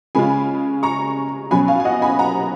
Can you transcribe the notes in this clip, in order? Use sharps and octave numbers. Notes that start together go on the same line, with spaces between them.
C#3 G#3 C#4 F4 G#5 B5
A#5 C#6
B2 F#3 C#4 G#5 B5
F5 G#5
G#5
D#5 F#5
G#5 B5
F#5 A#5